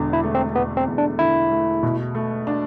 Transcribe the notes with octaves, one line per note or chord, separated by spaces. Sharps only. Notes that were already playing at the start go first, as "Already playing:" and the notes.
Already playing: E1 E2 D3
E4
A3
C4
E1 B3
C4
E2
D4
D3 E4
A3
B2
A3
D4